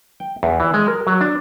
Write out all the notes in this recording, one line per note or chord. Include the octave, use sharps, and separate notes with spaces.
G5
E2
E3
G#3
A#4
F#3
D4